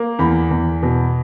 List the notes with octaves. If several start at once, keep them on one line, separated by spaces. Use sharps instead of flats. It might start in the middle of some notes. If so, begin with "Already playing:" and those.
Already playing: A#3
E2 B5
E2
B2